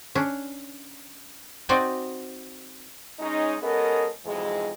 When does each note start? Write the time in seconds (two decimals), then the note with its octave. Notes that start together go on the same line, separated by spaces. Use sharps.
0.15 C#4 D4
1.69 C4 D#4 F#4 D5 G5 G#5
3.19 G#3 C#4 D#4
3.62 G#3 B3 C#4 A4 A#4 D#5
4.25 B1 F2 G#2 E3 G#3